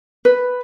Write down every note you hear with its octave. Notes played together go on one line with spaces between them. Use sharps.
B4